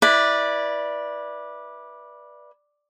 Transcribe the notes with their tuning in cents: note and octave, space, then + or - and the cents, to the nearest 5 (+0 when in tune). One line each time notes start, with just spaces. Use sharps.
E4 +0 B4 -20 D5 +5